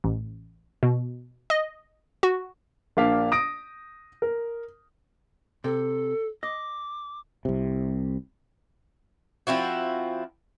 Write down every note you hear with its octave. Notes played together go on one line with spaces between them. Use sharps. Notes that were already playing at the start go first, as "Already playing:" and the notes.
A1
B2
D#5
F#4
A#1 A#3 D4 F5 B6
D#6 A#6 D7
A#4
C3 A4
D#5 D6
C2 C3
F3 C4 E4 F#4